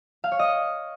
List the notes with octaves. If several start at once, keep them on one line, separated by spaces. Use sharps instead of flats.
F5
C#5
D#5